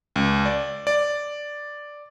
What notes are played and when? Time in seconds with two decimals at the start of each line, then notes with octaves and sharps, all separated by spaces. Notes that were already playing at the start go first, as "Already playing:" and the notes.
0.16 C#2
0.45 D5
0.87 D5